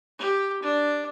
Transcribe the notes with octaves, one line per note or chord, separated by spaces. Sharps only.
G4
D4